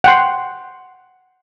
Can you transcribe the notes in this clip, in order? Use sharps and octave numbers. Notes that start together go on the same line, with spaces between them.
F#5 G5 C6